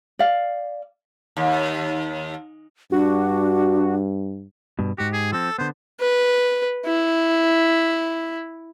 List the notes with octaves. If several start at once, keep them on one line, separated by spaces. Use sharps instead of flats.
D5 F5
D#2
G2 D4 F#4
G2 B2
G#2 F#4 G4
G#4
F3 C4 A4
D3 B3 C5
B4
E4